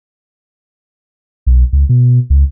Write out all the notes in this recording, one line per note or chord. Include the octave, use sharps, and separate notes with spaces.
B1
C#2
B2
C#2